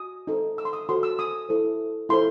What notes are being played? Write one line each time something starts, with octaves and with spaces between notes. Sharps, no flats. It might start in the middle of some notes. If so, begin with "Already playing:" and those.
Already playing: F#4 D#6
D#4 A4 C5
E6
C6
D#6
F#4 A4 C5 C6
E6
D#6
E4 A4 C5
E4 A4 C5 C6